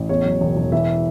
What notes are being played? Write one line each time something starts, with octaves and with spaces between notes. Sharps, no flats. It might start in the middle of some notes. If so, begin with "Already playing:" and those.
Already playing: A1
E2 C#5
F#3
E1
E1
E3 E5